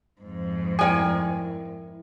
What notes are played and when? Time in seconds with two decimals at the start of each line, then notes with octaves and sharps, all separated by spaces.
0.21 F2 G#2
0.79 E4 A4 A#4 D5 G5 G#5